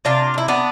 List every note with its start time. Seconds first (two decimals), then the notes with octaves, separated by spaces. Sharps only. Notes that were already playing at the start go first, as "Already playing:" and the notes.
0.05 C3 D4 F4
0.34 C3 E4
0.48 B3 D4